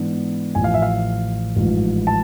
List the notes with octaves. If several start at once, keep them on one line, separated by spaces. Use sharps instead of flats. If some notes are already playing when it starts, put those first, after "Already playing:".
Already playing: G#2 E3 B3 D4
A1 A2 F3 G#5
F5
E5
F5
A1 G#2 F3
A5